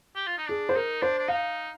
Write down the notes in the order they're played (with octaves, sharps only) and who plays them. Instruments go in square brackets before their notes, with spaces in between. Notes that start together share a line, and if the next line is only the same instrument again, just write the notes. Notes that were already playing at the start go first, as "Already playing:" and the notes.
[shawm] G4
F4
D#4
[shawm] D4 [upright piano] G#4
[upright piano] C5
[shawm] D#4 [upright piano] A#4
[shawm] D4 [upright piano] C5
[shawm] D4
[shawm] D#4 [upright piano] F5